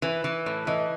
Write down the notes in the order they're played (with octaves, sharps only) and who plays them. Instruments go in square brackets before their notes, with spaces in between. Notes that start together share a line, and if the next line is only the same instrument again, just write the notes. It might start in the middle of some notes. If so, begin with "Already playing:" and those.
[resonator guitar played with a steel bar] E3 [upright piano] B4
[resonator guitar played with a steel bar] E3
A2
[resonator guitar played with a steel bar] E3 [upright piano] D#5